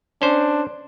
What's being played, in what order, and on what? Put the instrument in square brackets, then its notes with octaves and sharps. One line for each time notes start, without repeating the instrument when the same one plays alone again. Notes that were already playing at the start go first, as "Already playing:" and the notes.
[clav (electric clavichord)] C#4 C5 [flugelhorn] D4